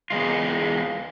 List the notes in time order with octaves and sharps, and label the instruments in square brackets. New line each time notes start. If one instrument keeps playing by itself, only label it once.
[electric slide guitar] E2 G#3 F4